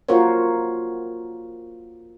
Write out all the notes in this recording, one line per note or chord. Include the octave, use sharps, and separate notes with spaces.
A#3 F4 F#4 A#4 C5 C#5